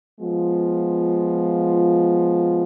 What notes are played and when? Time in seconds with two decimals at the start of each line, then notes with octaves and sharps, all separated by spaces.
0.20 F3 G#3 B3 F4